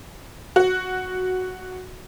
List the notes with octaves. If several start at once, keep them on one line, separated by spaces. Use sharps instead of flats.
F#4